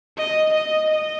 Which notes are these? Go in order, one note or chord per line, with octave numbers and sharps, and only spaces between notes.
D#5
D#5
D#5